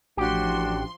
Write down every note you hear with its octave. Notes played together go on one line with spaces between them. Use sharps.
A1 F3 D4 F#4 G4 C6